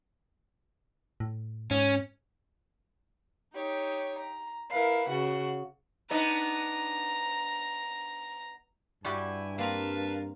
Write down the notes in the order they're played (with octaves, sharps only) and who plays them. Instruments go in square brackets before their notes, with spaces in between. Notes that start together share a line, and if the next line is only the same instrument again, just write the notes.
[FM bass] A2
[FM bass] G#2 [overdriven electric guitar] C#4
[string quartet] D#4 G4 C#5
A#5
E4 A#4 B4 F5
C#3 F#4 F#5
[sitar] B3 D4 D#4 [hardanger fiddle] A#5
[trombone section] G2 [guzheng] G3 F#4 G4 [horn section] E4 G#5
[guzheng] A#3 C4 A#5 [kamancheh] A#4 F5 [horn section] B4 A5